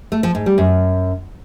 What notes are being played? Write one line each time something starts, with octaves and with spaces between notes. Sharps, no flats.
A3
F3
G#2
G3
F#2